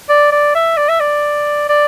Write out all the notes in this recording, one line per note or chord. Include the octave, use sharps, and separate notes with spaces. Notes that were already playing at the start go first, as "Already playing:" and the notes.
D5
D5
E5
D5
E5
D5
D5